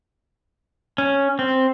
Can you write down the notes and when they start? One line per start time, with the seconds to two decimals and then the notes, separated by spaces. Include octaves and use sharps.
0.98 C#4
1.39 C4